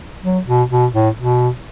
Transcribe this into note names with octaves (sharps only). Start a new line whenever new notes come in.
F#3
B2
B2
A2
B2